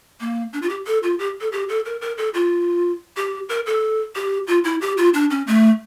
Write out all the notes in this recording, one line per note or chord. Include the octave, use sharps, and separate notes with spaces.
A#3
D4
F4
G4
A4
F4
G4
A4
G4
A4
A#4
A#4
A4
F4
G4
A#4
A4
G4
F4
E4
G4
F4
D4
C#4
A3